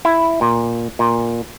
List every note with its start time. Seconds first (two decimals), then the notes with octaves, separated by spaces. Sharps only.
0.05 E4
0.41 A#2
0.99 A#2